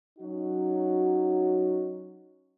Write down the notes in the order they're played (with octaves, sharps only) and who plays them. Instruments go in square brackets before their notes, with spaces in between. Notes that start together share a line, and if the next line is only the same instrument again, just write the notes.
[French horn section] F#3 C#4 D#4 F#4